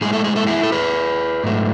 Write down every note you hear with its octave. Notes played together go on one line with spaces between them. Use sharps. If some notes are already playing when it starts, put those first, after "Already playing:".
A2 G#3 G#4
A4
G#4
A4
E4 G#4
A4
G#4 B4
G#2 F#3 A3